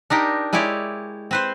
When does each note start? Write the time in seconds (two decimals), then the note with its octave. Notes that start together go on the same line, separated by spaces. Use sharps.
0.10 D4 D#4 G4 A#4
0.53 G#3 E4 G4 C#5 D5
1.31 C4 B4 C5